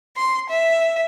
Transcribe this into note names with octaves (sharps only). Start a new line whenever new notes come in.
C6
E5